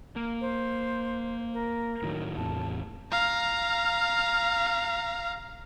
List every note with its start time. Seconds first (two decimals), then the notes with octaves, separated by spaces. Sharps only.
0.16 A#3
0.41 C5
1.53 A#4
2.02 A2 D#3 F#3
2.37 E2 A2 C3 A5
3.12 F5 A#5